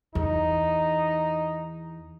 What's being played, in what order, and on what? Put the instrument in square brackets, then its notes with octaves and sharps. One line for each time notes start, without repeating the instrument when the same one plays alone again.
[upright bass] E2 [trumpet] D#4